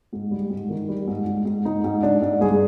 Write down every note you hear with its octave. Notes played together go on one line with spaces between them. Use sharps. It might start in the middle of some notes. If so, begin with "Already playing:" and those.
G#2
G3
G#2
D#3
G3
G#2
G#2
G#2
G#2 D#4
G#2
G#2 D4
G#2
G2 G#4